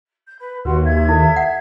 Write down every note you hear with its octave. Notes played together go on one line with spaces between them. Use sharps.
G6
B4
D#2 F#4 B4 C6
E5 G#6
E4 A4
F#5